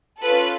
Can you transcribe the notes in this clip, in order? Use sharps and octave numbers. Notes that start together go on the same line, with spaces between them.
C#4 F4 A4 B4